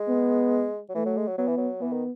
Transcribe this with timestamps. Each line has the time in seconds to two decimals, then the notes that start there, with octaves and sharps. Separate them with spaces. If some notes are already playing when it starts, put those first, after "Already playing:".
Already playing: G#3
0.08 B3
0.89 F#3
0.95 E3 A3
1.06 F#3
1.17 G#3
1.27 F#3
1.38 F#3 B3
1.48 E3
1.58 F#3
1.81 E3 B3
1.93 D#3